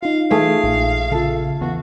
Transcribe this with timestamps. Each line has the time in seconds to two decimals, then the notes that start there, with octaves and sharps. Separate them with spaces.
0.03 D#4 F4 F5
0.31 E3 A3 G#4 F5
0.64 A#1
1.12 C#3 F4 A4
1.61 E2 F#4